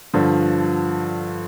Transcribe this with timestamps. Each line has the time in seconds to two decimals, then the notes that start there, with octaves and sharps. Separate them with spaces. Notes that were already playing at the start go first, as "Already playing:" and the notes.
0.13 G2 D3 F3